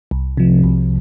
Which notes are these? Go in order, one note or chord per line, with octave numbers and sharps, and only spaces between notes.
C2
C3 F3
C2